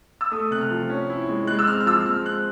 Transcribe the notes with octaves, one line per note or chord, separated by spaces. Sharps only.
E6
A3 D#6
C3 F#6
F6
F3
C#4
E4
G#3
G#3 F#6
E6
C4 F6
F6
F3 E6
G#3 F6
C4 F#6